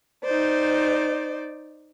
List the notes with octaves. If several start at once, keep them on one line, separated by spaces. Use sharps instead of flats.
D#4 C5 D5